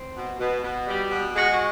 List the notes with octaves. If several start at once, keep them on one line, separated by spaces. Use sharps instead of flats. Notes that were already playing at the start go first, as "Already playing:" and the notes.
Already playing: C4
B2
B2
B2
G3
B2
G#3 F#4
F#4